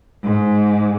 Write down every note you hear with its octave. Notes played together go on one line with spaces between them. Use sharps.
G#2